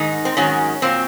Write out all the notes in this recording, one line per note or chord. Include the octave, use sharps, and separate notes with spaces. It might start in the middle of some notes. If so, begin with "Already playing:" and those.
Already playing: G#2 D#3 D#4
C4
G#2 D#3 F#3 C#4
A#2 F#3 C4